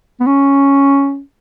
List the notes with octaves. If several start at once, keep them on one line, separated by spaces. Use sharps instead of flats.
B3
C#4